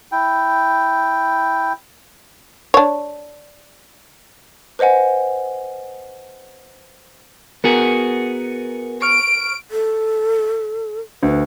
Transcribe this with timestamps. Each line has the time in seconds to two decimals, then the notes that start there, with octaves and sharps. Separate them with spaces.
0.12 E4 G5
2.74 D4 C#5
4.79 B4 C5 D#5 F#5 G#5
7.64 B3 F#4 G#4 A#4
9.02 C#6 F6 D7
9.71 A4
11.23 D2 B4